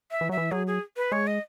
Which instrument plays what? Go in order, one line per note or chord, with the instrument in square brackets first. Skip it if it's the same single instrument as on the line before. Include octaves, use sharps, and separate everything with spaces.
[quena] E5
[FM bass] E3
[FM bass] F#3 [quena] E5
[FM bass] E3
[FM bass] F#3 [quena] G#4
[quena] G#4
B4
[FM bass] G#3 [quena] C#5
[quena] D#5